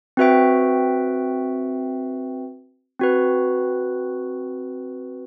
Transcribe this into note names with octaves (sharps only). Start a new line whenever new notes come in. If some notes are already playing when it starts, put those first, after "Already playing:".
C4 F#4 B4 E5 G5
C4 F#4 B4